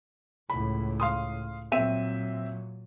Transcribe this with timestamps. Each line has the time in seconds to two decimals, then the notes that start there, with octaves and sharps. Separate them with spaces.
0.50 C#2 A2 B5
1.00 F5 C6 D#6
1.72 A#2 F#3 C4 E5 D#7